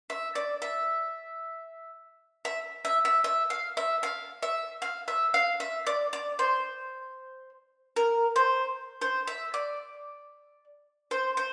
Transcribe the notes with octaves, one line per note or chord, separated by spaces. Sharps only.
E5
D5
E5
E5
E5
E5
E5
F5
E5
F5
E5
F5
E5
F5
E5
D5
D5
C5
A#4
C5
C5
E5
D5
C5
C5